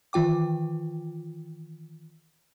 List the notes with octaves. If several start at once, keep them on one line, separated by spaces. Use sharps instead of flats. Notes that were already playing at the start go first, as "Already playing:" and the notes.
D#3 E3 F4 G5 D6